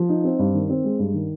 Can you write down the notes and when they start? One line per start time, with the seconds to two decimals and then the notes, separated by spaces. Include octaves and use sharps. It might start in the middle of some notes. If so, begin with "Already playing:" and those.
Already playing: F3
0.09 D#4
0.24 C4
0.39 G2
0.54 D#3
0.69 C4
0.84 G#3
0.99 G2
1.14 D#3